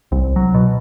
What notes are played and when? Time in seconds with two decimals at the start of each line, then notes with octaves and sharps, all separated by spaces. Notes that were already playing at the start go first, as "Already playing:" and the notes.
0.12 C2
0.36 F#3
0.54 B2